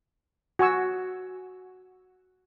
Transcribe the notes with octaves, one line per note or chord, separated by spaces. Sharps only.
F#4 G#5 C#6 E6